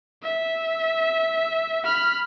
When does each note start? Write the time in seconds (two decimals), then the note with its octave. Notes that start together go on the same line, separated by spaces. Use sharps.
0.23 E5
1.84 B5 F6